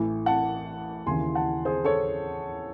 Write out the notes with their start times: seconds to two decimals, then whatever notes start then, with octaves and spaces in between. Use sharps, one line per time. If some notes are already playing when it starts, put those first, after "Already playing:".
Already playing: A1 A2 E3
0.26 F#5 A5
1.06 D#2 C#3 E3 G#5 C6
1.35 F#5 A5
1.65 G#4 C5
1.85 A4 C#5